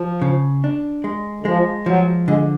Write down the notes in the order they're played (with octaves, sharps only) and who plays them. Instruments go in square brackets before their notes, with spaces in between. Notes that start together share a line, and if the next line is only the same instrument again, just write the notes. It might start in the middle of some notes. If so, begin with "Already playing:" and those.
Already playing: [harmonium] F3
[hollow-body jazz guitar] C#3
D4
G#3
[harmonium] D3
[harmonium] F3 [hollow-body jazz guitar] G#3
[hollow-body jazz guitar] F3 [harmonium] F#3
[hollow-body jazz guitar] D3 [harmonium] G#3